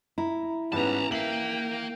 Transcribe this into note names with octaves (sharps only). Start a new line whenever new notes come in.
E4 A#5
G#2 G3 B3 C#4 B4 A5 A#5
A#3 A#4 E5 F5 G5 F#7